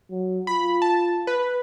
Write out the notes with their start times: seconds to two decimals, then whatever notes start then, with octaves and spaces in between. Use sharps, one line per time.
0.10 F#3
0.47 F4 B5
0.82 A5
1.27 B4